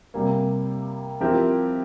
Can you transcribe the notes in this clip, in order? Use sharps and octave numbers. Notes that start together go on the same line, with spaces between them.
C3 G3 A#3
F3 C4 E4 G4 A#4